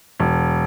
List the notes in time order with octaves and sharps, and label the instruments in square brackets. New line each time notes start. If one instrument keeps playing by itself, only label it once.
[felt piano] E1